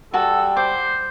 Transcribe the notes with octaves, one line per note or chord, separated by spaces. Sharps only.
G3 F#4 A4 F#5 A5
C5 D6